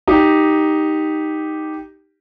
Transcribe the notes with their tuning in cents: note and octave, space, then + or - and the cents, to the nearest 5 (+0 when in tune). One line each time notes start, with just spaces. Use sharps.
D#4 +0 G4 +0